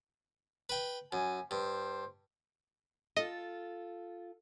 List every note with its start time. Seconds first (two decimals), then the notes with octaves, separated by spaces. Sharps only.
0.69 B4 G5
1.12 F#2 G#5
1.51 G2 C5
3.17 F4 A4 D#5